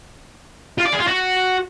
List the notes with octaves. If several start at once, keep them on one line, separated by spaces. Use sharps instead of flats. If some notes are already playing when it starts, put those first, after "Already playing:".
F4
D5
G#4
F4
F#4